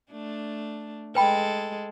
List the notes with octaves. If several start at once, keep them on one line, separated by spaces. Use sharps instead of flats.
A3 D4
G#3 A4 B4 G5 B5